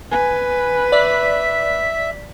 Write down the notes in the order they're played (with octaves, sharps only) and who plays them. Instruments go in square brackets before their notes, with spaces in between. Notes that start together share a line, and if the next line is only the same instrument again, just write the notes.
[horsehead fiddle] B4 [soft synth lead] G#5
[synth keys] D5 [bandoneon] E5 [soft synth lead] B6